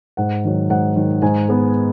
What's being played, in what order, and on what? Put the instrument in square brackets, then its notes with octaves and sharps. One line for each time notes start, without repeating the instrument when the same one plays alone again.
[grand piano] G#2 F#5
D#3 F#3
G#2 F#5
D#3 F#3
G#2 G#5
G#3 B3